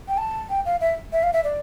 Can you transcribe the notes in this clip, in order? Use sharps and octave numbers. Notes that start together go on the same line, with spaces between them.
G5
A5
G5
F5
E5
E5
F5
E5
D5